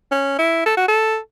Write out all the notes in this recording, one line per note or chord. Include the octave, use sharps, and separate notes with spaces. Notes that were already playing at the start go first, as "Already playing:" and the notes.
C#4
E4
A4
F#4
A4